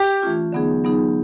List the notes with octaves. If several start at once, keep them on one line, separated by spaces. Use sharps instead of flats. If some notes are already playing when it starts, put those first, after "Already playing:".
Already playing: G4
E3 A3 C#4 F4
D3 F#3 B3 D#4 G#4
D3 F#3 B3 D#4 G#4